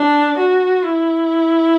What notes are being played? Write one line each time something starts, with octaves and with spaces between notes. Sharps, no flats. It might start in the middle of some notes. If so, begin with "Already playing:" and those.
Already playing: D4
F#4
E4